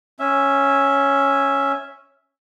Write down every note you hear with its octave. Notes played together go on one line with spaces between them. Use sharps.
C#4 E5